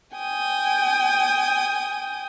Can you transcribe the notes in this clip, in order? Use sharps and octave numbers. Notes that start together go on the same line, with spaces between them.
G5 G#5 D#6